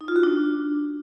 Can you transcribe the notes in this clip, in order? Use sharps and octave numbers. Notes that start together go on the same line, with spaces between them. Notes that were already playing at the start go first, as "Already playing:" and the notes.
D#4
F4
F#4
D4